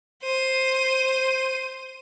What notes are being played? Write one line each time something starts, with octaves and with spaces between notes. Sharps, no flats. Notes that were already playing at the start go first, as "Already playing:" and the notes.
C5 D#7